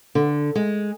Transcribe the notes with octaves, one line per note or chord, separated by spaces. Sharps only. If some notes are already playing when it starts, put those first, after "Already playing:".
D3
G#3